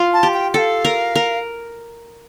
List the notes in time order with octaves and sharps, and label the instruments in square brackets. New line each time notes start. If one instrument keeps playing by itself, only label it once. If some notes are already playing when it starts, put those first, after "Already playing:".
Already playing: [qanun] F4
[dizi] A5
[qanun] G4
[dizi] G5
[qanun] A4 [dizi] F5 G5
[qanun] A#4
A#4